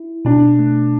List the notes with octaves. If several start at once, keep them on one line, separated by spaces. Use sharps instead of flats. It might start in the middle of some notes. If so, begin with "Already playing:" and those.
Already playing: E4
B2 D4
A3